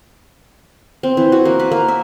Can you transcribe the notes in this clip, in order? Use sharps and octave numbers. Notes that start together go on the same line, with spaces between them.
C4
E3
F#4
A#3
B4
A#3
E5